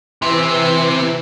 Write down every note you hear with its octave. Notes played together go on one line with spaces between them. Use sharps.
C3 E3 C4